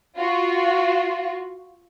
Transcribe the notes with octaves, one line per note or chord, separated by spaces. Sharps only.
F4 F#4